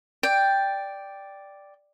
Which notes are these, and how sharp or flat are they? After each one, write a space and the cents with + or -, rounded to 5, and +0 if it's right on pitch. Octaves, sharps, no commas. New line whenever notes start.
D5 +0 G5 +5